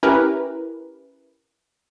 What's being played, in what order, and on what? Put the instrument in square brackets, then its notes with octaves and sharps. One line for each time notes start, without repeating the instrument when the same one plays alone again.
[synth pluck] C#4 E4 G4 A#4 B4